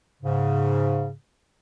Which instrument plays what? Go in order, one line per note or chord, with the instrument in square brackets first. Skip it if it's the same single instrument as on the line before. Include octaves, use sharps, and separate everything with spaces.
[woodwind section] G#2 C#3